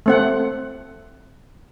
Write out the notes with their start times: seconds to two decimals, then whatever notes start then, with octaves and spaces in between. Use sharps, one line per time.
0.06 A3 C4 F#5